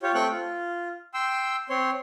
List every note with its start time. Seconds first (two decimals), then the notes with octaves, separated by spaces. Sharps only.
0.03 F4 G4 C#5
0.14 A3 C4 G5 C#6 F#6
0.31 F4
1.14 G5 C6 E6
1.70 C4 C#5 C6